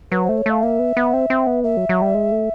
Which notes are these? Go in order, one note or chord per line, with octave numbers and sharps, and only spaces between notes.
F#3 B4
A3 C5
C#5
A3 F5
A#3 E5
B3
B3
C4
C4
B3
A#3 E5
F#3
F#3
G3
G#3
A3